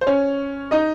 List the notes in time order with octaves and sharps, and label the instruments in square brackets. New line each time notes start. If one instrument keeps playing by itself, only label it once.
[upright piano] C5
C#4 C#5
D#4 D#5